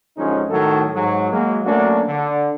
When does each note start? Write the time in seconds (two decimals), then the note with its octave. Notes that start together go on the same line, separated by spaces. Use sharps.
0.18 F#2 D3 F3 G#3 C#4 D#4
0.50 A2 D#3 F#3 A4
0.95 G#2 F#3
1.32 F#3 G#3 A#3
1.65 F#3 A3 A#3 C#4 D4 F#4
2.08 D3